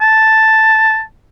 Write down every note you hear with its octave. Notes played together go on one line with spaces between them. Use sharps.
A5